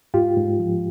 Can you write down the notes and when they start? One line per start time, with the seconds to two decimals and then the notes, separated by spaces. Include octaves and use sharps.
0.14 G#2 F4 G4
0.37 G#2
0.59 F3